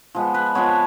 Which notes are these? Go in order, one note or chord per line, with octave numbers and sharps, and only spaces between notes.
F3 G#3 B3
B4
F3 G#3 B3 C#5